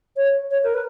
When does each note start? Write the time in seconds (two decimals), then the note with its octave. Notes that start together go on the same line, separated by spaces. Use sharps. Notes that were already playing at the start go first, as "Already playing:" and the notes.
0.16 C#5
0.51 C#5
0.63 A#4
0.74 B4